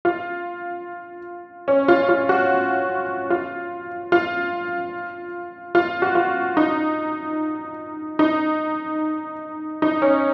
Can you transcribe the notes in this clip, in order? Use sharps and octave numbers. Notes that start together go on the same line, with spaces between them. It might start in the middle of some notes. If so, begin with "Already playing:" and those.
F4
C#4
F4
F4
F#4
F4
F4
F4
F#4
F4
D#4
D#4
D#4
C#4